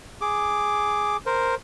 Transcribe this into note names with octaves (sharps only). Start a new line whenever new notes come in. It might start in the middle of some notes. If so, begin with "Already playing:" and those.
G#4 D6
A#4 C5